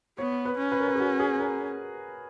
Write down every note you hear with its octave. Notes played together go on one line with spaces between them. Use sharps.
B3 C#5
B4
C#4
B4
A#4
B4
G#4
F#4
G#4
A#4